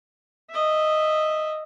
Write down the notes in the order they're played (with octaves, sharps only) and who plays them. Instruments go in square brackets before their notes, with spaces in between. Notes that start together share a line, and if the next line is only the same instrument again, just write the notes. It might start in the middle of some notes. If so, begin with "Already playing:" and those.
[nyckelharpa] D#5 E5